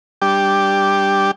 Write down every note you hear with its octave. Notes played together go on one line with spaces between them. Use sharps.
G3 D4 G4